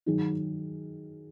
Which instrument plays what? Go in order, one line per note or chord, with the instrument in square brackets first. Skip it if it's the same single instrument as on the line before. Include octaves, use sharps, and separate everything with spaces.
[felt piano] D#3 F#3 D#4 G#4